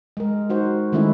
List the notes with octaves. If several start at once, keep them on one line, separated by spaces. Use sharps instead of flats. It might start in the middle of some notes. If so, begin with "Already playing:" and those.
G#3 A#4
D#4 F#4 C5
D#3 G#3 A3 C#4 E4